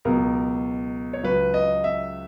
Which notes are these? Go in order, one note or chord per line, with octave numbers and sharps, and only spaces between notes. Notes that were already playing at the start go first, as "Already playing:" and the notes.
C#2 B2 F#3 A#4
C#5
C#2 C#3 F#3 B4
D#5
E5